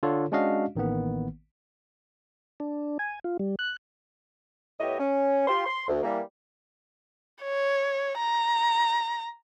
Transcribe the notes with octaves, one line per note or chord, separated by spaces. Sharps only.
D3 F4 A4 C#5
G#3 C#4 D4 F#4 D#5 F5
A1 D#3 A#3 B3
D4
G#5
F4
G3
F#6
A2 B3 E4 G4 C#5 D#5
C#4
F4 G4 C6
C6
D2
E3 G3 A#3
C#5
A#5